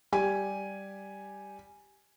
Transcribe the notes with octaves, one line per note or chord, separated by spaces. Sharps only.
G3 G4 G#5